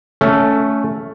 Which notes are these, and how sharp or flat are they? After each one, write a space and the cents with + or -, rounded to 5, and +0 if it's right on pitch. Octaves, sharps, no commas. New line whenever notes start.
A3 +0 C#4 +15